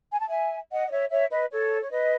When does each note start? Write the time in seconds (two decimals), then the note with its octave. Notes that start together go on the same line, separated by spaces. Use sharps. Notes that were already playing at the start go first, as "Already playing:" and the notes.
0.12 G#5
0.19 A5
0.27 E5 G#5
0.71 D#5 F#5
0.86 D#5
0.91 C#5 E5
1.11 C#5 E5
1.31 B4 D#5
1.51 A4 C#5
1.82 C#5
1.91 B4 D#5